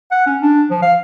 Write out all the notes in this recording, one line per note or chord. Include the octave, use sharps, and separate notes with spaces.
F#5
C#4
D4
F3
F5